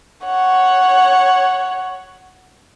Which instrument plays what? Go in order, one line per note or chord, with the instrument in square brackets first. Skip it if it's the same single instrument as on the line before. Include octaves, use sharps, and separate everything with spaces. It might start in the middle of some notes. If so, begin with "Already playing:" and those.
[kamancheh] C#5 F#5